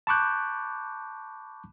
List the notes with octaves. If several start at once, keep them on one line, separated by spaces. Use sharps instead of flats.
A5 B5 C#6 D6 F#6 G6